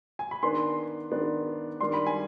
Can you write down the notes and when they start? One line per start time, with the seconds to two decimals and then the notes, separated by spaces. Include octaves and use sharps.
0.19 G#5
0.31 B5
0.43 D#3 B3 D4 C6
1.12 D#3 B3 D4
1.80 D#3 G3 D4 C6
1.93 B5
2.06 G#5